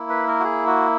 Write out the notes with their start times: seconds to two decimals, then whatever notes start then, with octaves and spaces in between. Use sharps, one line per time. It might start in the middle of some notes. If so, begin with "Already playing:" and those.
Already playing: A#3 E4
0.09 B4
0.27 A#4
0.40 F#4
0.44 G#4
0.67 F#4